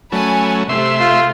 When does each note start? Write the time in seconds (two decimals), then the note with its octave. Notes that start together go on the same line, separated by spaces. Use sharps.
0.12 F#3 A3 C#4 G#5 A5 B5
0.69 C3 A3 E5 C6
1.00 F4